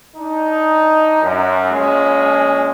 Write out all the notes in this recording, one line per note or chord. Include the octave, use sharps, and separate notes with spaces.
D4 D#4
F#2
A#1 G#3 C#4